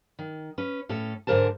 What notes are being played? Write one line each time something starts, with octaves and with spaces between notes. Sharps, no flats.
D#3
C#4 B4
A2 C#4 A4
G#2 D3 E3 A#4 C5 A5